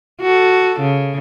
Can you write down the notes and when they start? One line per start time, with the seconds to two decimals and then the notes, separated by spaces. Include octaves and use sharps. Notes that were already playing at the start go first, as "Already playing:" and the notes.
0.21 F#4 A4
0.80 C#3